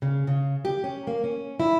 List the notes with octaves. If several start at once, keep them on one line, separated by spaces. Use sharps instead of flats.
C#3
C#3
G4
C#4
A#3
C#4
E4